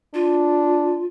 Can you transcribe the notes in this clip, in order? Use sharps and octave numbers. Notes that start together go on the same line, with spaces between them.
D4 F4